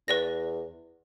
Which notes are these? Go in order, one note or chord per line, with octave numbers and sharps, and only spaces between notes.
E2 B4 D5 A#6